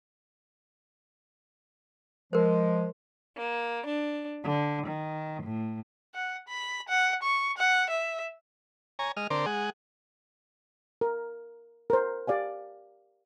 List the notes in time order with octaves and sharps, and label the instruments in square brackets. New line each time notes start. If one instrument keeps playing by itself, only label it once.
[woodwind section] F3 G#3 [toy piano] A#4 C5
[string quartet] A#3
D4
D3
D#3
A2
[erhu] F#5
B5
F#5
C#6
F#5
E5
[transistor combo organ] C#5 G#5 A#5
G#3 D#5 F6
D3 C4 A#4 C5 D5
G#3 G#4 F#5
[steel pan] A#4
A#4 C5
G4 D5 F5 G#5